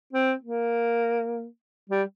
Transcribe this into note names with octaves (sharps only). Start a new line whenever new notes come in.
C4
A#3
G3